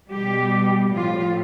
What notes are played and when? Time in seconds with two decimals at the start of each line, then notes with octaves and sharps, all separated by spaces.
0.10 B2 G3 G4
0.94 A2 F3 F4